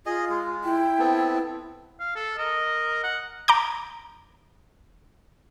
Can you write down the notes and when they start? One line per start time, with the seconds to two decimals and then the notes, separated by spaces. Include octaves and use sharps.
0.06 F4 G#4 D#5
0.30 G#3
0.64 E4 G5
0.99 B3 C4 A4
2.00 F5
2.16 A4
2.38 A#4 D#5
3.04 F#5
3.48 A#5 D6 G6